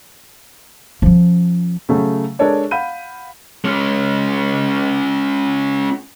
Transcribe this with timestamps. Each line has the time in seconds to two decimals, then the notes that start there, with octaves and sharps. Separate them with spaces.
1.02 F3 C#4
1.89 C#3 F#3 A3
2.39 G#3 D4 A4 A#4 C#5 D5
2.71 F5 F#5 B5 G6 D#7
3.65 G#3 C#4